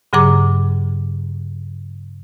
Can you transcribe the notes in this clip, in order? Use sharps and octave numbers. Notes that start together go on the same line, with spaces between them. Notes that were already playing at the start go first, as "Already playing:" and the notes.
G2 C#3 F#3 G#4 A#5 D6